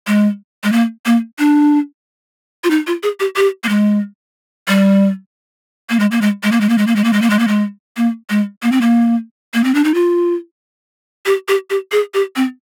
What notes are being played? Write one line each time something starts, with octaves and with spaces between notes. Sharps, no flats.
G#3
G#3
A#3
A#3
D4
F4
D#4
F4
G#4
G4
G4
A#3
G#3
G3
A#3
G#3
A#3
G#3
G#3
A#3
G#3
A#3
G#3
A#3
G#3
A#3
G#3
A#3
G#3
A#3
G#3
A#3
G#3
A#3
C4
A#3
A#3
C4
D4
D#4
F4
G4
G4
G4
G#4
G4
C4